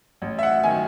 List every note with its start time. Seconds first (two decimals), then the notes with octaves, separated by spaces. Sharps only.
0.22 A1
0.39 E5
0.43 F#5
0.63 D#3 G#5